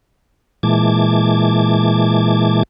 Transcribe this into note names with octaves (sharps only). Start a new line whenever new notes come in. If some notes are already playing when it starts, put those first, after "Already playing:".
A#2 E3 G#3 A5 D6 G#6